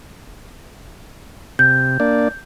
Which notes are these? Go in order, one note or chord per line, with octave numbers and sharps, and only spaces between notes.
C3 G6
A#3 D4 D5